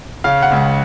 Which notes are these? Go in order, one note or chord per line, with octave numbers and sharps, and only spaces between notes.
C#3 F5
F#5
C#2